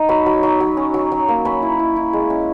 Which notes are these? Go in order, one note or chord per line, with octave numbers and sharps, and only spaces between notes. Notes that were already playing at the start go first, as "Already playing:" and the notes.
Already playing: D#4
F#3 B5
F#3
F#3
F#3
C#4
F#3
F#3
A#3
C#4 B5
E4
E4
E4
G#3
C#4